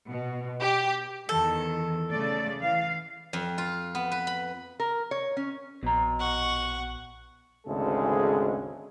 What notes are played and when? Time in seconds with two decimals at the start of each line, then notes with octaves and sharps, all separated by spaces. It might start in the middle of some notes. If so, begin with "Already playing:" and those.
0.10 B2
0.60 G4
1.29 E2 D#3 A4
2.09 C#3 A3 D5
2.59 E3 F5
3.33 F2
3.58 F4
3.95 B3
4.12 B4
4.27 B5
4.80 A#4
5.11 C#5
5.37 C#4
5.83 A#1 B2 A#5
6.20 F#5 C#6
7.67 G#1 D2 C#3 G#3 G#4 A4